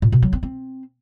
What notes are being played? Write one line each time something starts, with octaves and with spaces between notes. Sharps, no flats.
A#2
B2
F#3
C4
C4